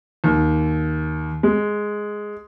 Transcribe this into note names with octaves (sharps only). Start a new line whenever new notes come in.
D#2
G#3